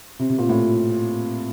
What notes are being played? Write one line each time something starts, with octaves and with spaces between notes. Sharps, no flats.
C3
C3
A#2
A2